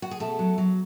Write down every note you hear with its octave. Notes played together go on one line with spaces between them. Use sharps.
F#4
G#4
B2 A3 A4
F#3
F#3